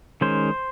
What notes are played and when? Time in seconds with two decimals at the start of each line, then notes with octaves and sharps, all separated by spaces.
0.21 D#3 G#3 C#4 C5